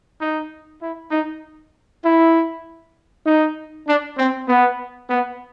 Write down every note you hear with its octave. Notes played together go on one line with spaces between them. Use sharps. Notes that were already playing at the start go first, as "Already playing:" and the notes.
D#4
E4
D#4
E4
D#4
D4
C4
B3
B3